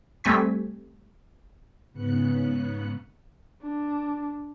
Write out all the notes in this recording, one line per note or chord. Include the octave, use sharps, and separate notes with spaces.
G3 A3 C4 G#5 C#6 B6
G#2 C#3 B3 F#6 C#7
D4